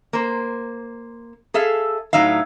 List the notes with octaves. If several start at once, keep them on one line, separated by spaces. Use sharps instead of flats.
A#3 C5
G#4 A4 E5 F5
A2 F#3 D#4 E5 F5